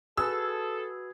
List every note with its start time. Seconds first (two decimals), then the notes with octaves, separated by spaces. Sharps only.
0.17 F#4 G#4 A4 B4 E6